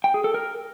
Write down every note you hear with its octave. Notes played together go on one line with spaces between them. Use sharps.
G5
G#4
A4
A#4